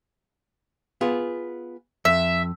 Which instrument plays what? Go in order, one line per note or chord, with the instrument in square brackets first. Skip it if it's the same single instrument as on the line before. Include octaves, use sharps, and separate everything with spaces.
[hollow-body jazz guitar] B3 F4 G#4
[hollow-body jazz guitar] F2 [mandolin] E5